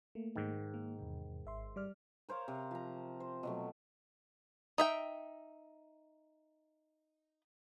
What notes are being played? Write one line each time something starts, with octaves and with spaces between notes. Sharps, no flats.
A3 A#3
G#2 D#3
A#3
E2 C3
G#1 E5 C6
G3 D5 F6
A#4 C5 C#5 F5
C3
F3 A#5
C5
B2 F#3 A3
D#4 E5 G5